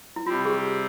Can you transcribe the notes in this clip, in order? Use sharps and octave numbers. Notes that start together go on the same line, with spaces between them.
E4
C3 G3 C4 F4
G#4
G4